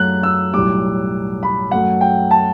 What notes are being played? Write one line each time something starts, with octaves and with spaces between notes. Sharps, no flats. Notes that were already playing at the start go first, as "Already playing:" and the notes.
Already playing: F#2 F#3 A3 F#6
E6
B1 A2 G3 D6
B5
F#2 F#3 A3 F#5
G5
A5